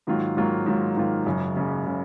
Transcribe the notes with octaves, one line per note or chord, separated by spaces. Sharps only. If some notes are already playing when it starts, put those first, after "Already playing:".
G#2 D#3 F#3 A#3 F4
G#2 D#3 F#3 A#3 F4
G#2 D#3 F#3 A#3 F4
G#2 D#3 F#3 A#3 F4
F#1 F#2 C#3
F#1 F#2 C#3
C#3